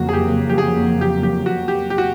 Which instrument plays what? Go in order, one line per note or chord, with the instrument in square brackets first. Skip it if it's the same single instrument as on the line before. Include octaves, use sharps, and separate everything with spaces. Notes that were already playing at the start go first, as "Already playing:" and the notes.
Already playing: [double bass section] F2 C#3 F#3 A#3 [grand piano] F#4
[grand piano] G#4
G4
G4
G#4
G4
G4
F#4
G4
G4
F#4